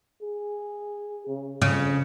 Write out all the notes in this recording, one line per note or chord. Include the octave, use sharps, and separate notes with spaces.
G#4
C#3
F2 C#3